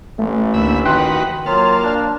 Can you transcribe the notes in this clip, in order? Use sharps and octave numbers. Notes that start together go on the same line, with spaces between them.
A1 A3
D2 A#3 E5 B5
D#3 F#4 B4 G5 C6 F#6
F#3 A#3 F4 F5 A5
D4